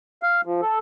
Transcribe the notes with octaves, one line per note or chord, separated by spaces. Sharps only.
F5
F3
A4